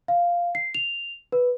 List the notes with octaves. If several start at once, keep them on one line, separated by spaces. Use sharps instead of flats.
F5
C7
F7
B4